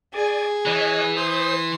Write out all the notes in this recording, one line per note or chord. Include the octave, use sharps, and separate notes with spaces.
G#4 D5 G#5
E3 C#5 D#5 F#6
C5 C6 D#6